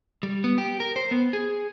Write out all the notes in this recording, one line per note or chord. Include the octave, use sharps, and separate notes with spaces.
G3
B3
G4
A#4
C5
B3
G#4